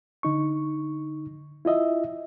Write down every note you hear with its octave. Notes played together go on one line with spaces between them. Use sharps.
D3 D#4 C#6
E4 F4 D#5 E5